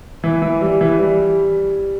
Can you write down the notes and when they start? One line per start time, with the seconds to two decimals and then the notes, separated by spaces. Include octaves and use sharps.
0.24 E3
0.42 E3
0.61 G3
0.81 E3
0.99 G3